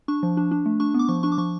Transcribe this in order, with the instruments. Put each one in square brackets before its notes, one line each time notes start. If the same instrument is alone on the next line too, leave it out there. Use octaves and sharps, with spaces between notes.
[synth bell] D4 C#6
F3
D4
D4
A3
D4 C#6
B3
D6
F3 C#6
D4 C#6
D6
F3 C#6